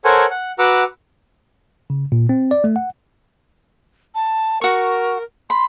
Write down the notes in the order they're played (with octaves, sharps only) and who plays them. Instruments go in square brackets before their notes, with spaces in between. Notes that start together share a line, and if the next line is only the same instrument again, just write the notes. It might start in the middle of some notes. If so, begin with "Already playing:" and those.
[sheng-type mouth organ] A4 A#4 C5 C#5 F#5 G#5
F#5
F#4 B4 F#5 A#5 D6 E6
[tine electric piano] C#3
A#2
C4
D5
A3
F#5
[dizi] A5
[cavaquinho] F#4 C#6 [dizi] A#4
[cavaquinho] B5 [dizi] C6